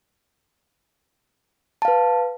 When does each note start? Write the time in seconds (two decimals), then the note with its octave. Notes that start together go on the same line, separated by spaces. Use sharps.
1.82 A5
1.85 F5
1.88 B4